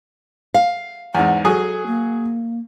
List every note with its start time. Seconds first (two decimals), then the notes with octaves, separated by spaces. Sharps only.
0.54 F5
1.15 E2 G#2 F#5
1.45 F#3 G#4 A4 D#6
1.87 A#3